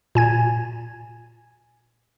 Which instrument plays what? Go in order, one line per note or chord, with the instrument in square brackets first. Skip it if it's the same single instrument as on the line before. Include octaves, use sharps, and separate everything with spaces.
[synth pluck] A#2 G#5 G#6